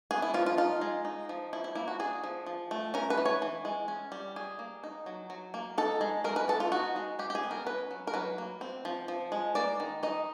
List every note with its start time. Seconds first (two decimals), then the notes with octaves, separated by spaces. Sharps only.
0.11 B3 G#4
0.22 E4
0.34 F3 F4
0.46 F4
0.58 D#4 F4
0.81 G#3
1.05 D#4
1.29 F3
1.53 F3 E4
1.64 E4
1.75 A#3 E4
1.88 F#4
1.99 D4 G#4
2.24 F3
2.46 F3
2.71 A3
2.94 C#4 A#4
3.10 B4
3.17 E3
3.25 C#5
3.42 E3
3.65 G#3
3.88 C#4
4.12 G3
4.36 G3 G#4
4.59 A#3
4.84 D#4
5.06 F#3
5.30 F#3
5.54 A#3
5.78 D#4 A4
6.01 G#3
6.24 G#3 A#4
6.36 B4
6.48 B3 A4
6.60 F4
6.72 D#4 F#4
6.96 G#3
7.19 G#3 G4
7.30 G4
7.35 G#4
7.43 B3
7.51 A#4
7.67 C#4 B4
7.91 F#3
8.07 A#4
8.14 F#3 B4
8.38 A#3
8.61 C4
8.85 F3
9.08 F3
9.32 G#3
9.55 A#3 D5
9.80 D#3
10.03 D#4 D#5